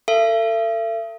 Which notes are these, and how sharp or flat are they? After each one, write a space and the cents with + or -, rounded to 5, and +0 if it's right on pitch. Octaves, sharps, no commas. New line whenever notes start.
A4 +30 E5 +40